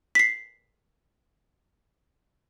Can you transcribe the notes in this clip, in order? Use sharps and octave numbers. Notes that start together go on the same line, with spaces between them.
B6 C7